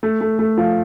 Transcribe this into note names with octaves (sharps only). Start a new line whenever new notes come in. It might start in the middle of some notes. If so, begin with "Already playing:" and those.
A3
A3
A3
F3